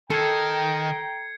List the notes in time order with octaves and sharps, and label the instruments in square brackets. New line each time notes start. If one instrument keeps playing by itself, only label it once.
[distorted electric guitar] D#3 [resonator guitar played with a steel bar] A4 [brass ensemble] G5 A#5 [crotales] G#6 C7 C#7